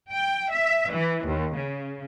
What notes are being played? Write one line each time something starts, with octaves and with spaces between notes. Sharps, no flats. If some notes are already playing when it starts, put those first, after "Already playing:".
G5
E5
E3
D#2
C#3